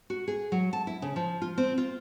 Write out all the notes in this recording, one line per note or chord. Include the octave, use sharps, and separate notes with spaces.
F#4
G#4
F#3
A5
E4
C#3
F3
F4
C4
F4